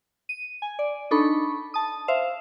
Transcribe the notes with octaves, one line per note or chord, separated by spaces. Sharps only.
D#7
G#5
D5
D4 D#4 A4 B5 C#6
A5 D#6
C5 E5 F5